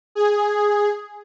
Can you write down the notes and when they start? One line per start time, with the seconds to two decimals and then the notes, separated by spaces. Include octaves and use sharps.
0.15 G#4